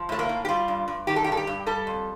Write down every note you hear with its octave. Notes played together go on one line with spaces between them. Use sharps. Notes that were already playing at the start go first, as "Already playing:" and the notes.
Already playing: F3
A2 A3
A#3
A2
G4
G3 F4
G2
G2
D#3 G4
A4
G2 G4
A4
G4
G2
G3 A4
F2